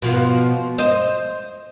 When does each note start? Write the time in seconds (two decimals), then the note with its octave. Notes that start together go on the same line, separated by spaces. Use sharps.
0.02 B2 F3 B3
0.78 C5 D#5